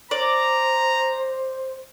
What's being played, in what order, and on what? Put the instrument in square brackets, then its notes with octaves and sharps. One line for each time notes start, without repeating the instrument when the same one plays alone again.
[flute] C5 [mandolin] D5 [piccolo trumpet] A#5